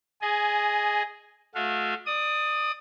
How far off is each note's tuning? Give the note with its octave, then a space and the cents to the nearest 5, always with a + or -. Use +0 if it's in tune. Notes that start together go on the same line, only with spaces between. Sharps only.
G#4 +0 D#5 -5 G#5 +20
A3 -30 F#4 -40 F5 -35
D5 +25 D#6 +0